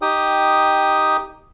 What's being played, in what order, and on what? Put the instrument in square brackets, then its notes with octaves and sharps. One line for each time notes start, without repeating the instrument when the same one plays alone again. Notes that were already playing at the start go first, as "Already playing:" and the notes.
[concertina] D#4 G4 G5 D#6